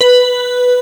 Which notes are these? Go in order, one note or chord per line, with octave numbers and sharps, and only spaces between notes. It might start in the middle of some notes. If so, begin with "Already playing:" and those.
B4